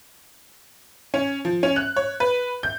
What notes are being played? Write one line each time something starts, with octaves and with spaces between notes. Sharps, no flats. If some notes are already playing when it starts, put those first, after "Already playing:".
C#4
F3
C#4
F#6
C#5
B4
G6